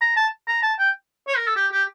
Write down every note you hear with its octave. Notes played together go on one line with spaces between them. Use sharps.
A#5
A5
A#5
A5
G5
C#5
A#4
A4
G4
G4